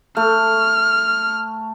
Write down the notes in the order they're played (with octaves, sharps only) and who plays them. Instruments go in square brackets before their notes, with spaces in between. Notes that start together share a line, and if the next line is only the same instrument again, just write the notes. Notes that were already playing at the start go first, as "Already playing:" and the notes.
[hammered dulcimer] A3 [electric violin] F6